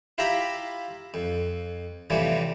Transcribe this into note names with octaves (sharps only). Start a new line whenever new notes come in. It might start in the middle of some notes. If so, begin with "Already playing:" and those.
E4 F4 G4 E5 A#5 B5
F2
A2 C3 E3 F3 G3